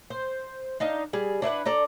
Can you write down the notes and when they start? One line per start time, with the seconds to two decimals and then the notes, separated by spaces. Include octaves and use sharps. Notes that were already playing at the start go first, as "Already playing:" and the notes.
0.10 C5
0.80 D4 D#4 D#5 F5
1.13 G3 G#4
1.42 D4 E4 B4 F#5
1.66 D4 A4 D5 A#5